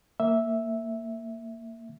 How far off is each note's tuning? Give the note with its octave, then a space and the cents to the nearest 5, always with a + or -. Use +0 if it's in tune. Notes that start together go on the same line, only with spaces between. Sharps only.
A#3 -15 E5 -5